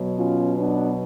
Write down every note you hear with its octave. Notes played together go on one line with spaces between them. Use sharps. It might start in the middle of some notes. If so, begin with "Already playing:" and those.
Already playing: B2 F#3
C#4 F4
B3 D4